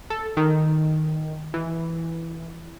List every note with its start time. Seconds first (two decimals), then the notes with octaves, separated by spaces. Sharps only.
0.10 A4
0.37 D#3
1.54 E3